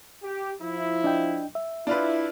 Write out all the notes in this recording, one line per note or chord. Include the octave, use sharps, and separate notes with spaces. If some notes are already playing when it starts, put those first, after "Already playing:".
G4
F3 E4
D4 D#5 G5
E5
D4 E4 F4 B4